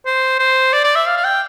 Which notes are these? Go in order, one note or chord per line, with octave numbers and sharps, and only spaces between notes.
C5
C5
D5
D5
E5
F5
F5
G5